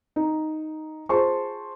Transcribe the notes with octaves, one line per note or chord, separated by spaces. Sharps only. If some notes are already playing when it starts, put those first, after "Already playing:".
D#4
F4 G#4 C5 A5 C6 C#6